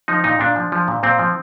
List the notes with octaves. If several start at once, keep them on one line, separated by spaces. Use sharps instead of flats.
F3 D#4
A#2 D#4
A#2 D4
F3
F3
A#2
A#2 C4
F3